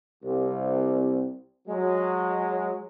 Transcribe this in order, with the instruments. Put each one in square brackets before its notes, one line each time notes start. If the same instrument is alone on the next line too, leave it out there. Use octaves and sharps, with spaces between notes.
[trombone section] C2
F#3 G#3